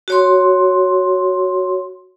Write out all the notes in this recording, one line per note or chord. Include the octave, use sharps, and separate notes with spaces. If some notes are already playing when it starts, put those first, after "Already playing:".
F#4 C#5 C6